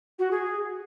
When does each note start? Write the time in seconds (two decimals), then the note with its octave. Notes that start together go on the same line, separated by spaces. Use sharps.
0.18 F#4
0.30 G#4